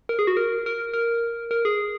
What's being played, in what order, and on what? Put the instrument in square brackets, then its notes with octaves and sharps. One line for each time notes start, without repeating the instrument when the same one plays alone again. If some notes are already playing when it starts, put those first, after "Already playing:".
[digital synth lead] A#4
G#4
F#4
A#4
A#4
A#4
A#4
G#4